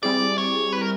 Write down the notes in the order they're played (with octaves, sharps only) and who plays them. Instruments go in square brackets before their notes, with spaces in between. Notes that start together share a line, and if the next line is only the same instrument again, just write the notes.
[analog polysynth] G3 C4 E4 G#4 [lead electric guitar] D5
[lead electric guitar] C#5
B4
A#4